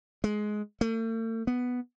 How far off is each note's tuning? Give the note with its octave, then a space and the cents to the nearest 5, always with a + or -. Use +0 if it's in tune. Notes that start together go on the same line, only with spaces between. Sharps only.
G#3 +15
A3 +45
B3 +0